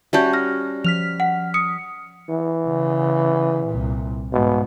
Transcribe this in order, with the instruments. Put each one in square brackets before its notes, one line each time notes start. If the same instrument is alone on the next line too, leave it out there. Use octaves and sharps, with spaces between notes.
[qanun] G3 C#4 F#4 [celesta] E5 A5 G6
[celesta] F6 A#6
[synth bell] F3 F6 B6 [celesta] F7
[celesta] F#5
D#6 C#7
[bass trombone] E3
[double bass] C#3
C2 A#2
[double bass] G#2 [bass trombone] B2